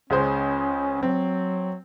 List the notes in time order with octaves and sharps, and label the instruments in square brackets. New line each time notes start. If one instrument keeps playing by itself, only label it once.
[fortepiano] C#2 G#3 C5 [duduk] C#4
[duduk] F#3 [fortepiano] C4